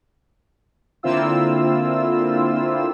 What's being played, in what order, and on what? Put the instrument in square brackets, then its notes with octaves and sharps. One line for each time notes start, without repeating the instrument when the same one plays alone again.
[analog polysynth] D3 A#3 C4 E4 F4 E6